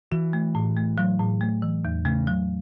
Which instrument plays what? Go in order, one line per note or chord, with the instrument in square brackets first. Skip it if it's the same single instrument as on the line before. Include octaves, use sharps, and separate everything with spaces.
[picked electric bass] E3 [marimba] F#4
[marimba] A3
A2
A3
F#3
A2
A3
E3
E2
[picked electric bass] C#3 [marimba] A3
[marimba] F#3